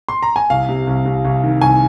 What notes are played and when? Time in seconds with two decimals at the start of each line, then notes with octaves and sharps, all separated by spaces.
0.08 C6
0.23 A#5
0.36 G#5
0.50 C2 F5
0.69 C3
0.87 C2
1.06 C2
1.25 C2
1.44 D#3
1.61 C2 G#5